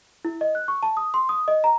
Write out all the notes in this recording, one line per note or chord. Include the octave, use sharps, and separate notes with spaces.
E4
D#5
F#6
C#6
A5
D#6
C6
D#6
D#5
A#5